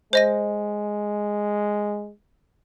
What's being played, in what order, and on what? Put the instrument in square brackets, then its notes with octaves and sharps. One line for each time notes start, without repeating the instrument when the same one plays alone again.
[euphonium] G#3 [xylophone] C5 D#5 A#6